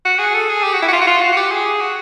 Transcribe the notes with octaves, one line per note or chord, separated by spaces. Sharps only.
F#4
G#4
A4
G#4
G4
F#4
E4
F#4
F4
F#4
F4
F#4
F#4
G4
G#4
F#4